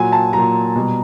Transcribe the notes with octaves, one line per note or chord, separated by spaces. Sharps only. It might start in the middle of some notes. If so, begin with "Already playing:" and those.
Already playing: A#2 F#3 G#5
A5
A#2 F#3 A#5
B2 G3